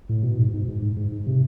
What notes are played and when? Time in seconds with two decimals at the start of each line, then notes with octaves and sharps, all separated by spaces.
0.09 A2
0.23 B2
0.38 G#2
0.54 G#2
0.68 G#2
0.82 G#2
0.97 G#2
1.12 G#2
1.27 C3